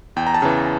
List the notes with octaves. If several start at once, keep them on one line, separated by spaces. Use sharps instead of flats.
E2 G5
A#5
A5
C#3 E3